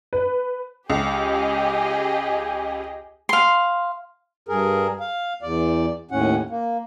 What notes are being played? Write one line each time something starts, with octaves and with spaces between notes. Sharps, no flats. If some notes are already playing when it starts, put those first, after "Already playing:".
B4
C#2 G4 G#4 D#5
F5 C6
G2 G#4 A#4
F5
E2 D5
D#2 A2 C#4 F#5
A#3